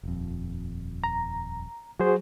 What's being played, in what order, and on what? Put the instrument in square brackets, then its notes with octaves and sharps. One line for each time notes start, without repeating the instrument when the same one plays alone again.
[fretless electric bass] D#1 F2
[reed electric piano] A#5
[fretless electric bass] F#3 [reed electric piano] F#4 G#4 C5